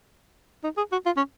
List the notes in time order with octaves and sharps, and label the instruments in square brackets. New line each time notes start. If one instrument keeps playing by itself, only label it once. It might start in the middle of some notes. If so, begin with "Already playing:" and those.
[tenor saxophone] D#4
G#4
F#4
F4
C#4